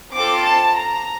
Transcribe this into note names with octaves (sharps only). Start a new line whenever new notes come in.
C4 F4 A4 D6
A5
A#5